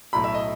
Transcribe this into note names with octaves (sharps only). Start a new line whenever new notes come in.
B1 A2 F#3 B5
E5
D#5